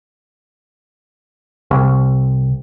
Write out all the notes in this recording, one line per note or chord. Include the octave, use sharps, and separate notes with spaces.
C2